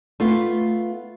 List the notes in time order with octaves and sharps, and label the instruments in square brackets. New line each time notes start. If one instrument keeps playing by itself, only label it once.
[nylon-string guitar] A3 B3 F4